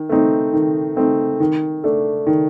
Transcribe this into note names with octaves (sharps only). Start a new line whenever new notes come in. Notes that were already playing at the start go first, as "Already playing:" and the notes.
Already playing: D#3
A3 C4 D#4
D#3
A3 C4 D#4
D#3
A3 D4 A4
D#3